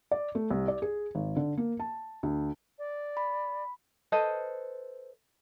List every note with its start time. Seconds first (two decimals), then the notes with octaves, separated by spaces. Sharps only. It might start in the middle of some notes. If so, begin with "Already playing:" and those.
0.11 D5
0.35 A3
0.51 C2
0.68 D5
0.82 G#4
1.15 G#1
1.36 D3
1.57 A#3
1.80 A5
2.23 D2
2.79 D5
3.17 B5
4.12 A4 B4 C5 D#5